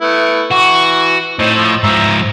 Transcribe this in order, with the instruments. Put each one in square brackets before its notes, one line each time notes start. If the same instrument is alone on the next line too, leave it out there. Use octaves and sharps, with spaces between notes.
[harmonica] A3 B3 E4
[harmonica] E3 C#6 [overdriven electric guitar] F#4
[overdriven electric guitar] A2 [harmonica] C4 D#4 C5
[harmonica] F3 E6
[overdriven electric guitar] G#2 F3 [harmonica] E5 A#5